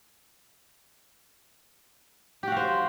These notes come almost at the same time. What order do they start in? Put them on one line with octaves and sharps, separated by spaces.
G4 F#4 F5 C5